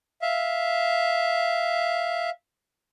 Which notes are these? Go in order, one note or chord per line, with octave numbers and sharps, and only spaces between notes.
E5 F5